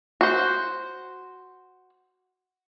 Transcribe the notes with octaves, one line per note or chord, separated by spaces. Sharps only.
F#4 C5